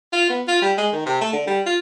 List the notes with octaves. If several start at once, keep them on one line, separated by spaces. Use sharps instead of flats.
F4
B3
F4
G3
G#3
D#3
C3
A3
D3
G3
F4